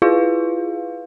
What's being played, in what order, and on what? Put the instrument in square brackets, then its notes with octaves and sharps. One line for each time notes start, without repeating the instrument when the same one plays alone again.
[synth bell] E4 F4 G#4 B4 F5